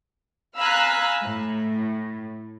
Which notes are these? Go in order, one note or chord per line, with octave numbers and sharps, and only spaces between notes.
F5 G#5 A#5 B5 E6 F#6
A2